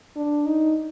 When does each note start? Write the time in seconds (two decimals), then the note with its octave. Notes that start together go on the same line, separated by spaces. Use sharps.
0.16 D4
0.46 D#4